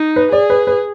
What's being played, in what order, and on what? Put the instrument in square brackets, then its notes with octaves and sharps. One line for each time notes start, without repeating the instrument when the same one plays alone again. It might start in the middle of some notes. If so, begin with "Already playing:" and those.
Already playing: [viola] D#4
[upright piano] B4
[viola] G#4 [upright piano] D5
[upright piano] B4
B4